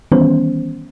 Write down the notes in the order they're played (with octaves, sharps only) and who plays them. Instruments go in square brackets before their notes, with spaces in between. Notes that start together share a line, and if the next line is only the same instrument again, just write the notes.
[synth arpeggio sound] D#3 E3 G3 B3 C#4 C5